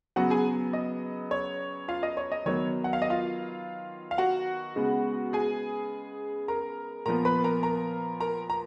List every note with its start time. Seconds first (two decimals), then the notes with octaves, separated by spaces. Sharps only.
0.16 C#3 F#3 B3 F#4 F#5
0.30 G#4 G#5
0.73 D#5
1.31 C#5
1.88 F4 F5
2.03 D#5
2.17 C#5
2.32 D#5
2.46 D#3 F#3 B3 C#5
2.84 F#5
2.93 F5
3.02 D#5
3.10 F4 F5
4.11 F5
4.18 F#4 F#5
4.76 C#3 G#3 B3
5.33 G#4 G#5
6.48 A#4 A#5
7.06 A#2 F3 B3 A#4 A#5
7.25 B4 B5
7.44 A#4 A#5
7.63 A#4 A#5
8.20 A#4 A#5
8.50 A#5